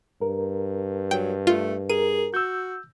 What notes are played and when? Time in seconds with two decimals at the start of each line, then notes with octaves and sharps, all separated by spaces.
0.21 G2 A#4
1.11 F#3 G5
1.47 A3 F4
1.89 G#4 A#4 D#7
2.34 F#4 E6 G6